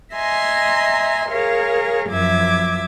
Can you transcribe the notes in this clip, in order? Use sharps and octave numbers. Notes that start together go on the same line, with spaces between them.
D#5 E5 G#5 A#5 C6
G#4 A#4 C#5 F5
F#2 F3 E5 D6 G#6